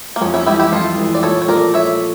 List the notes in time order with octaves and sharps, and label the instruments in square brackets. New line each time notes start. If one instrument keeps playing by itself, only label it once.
[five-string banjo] A#3
[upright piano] F2 [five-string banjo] C#4
[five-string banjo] C#4 E4
[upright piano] E3 G3 [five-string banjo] E4 G4
[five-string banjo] E4 G4
[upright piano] F2 [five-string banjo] F4 A4
[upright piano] E3 G3
[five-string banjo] D5
[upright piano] A#2 [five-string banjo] A4 C#5
[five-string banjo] C#5
[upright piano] F3 A3 [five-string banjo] A#4 D5
[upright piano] A#2 [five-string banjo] C#5 E5